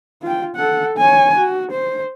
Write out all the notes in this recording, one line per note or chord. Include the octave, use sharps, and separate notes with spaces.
F4 G5
A4 F#5
C#5 G#5
F#4
C5